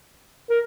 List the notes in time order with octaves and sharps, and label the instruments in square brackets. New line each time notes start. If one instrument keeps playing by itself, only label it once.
[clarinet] A#4